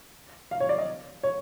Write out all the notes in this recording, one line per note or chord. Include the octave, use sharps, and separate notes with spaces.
F5
C#5
D5
D#5
C#5